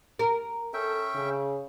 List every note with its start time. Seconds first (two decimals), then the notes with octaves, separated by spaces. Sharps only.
0.19 A#4
0.74 C#4 A4 E5 G5
1.14 C#3